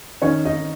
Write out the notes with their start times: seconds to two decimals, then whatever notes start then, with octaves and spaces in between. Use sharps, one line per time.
0.22 D#3 C#4 C#5
0.45 D#4 D#5